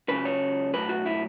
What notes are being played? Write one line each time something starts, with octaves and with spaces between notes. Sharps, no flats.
C#2 C#3 F#3 B4
C#5
B1 A2 F#3 B4
F#4
E4